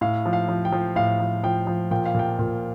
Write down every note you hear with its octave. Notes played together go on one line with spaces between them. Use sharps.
A2 F5
F3
F5
F3
G5
F3
A2 F5
F3
F3 G5
F3
A#2 G5
F5
A#2 G5
A#2